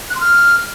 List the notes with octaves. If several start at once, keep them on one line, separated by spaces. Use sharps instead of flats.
F#6
C6
F6